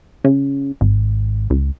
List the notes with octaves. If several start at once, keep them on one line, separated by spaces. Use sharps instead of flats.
C#3
G#1
C#2